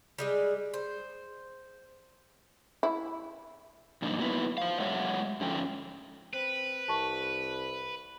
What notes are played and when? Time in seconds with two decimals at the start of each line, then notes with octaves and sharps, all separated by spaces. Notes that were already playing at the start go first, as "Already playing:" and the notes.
0.18 G3 G#3 G#4
0.74 C5
2.83 E4
4.02 G2 B2 F3 A#3 D4 D#4
4.19 F#3 A#3 B3 D#4 E4 B4
4.58 C5 F5
4.80 F#3 G#3 C#5 E5 F#5
5.41 G#2 D3 F3 C#4 A4 G5
6.34 C4 B4
6.88 C2 A5 C#6